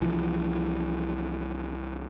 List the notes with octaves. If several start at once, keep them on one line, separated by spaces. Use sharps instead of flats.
C2 E3 F3